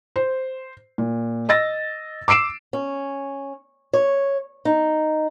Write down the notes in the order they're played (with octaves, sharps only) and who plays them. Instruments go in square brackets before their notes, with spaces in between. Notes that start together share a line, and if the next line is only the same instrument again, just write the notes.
[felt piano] C5
A#2
D#5 E6 A6 A#6
D6 E6 C7 D7 E7
[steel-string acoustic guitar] C#4
C#5
D#4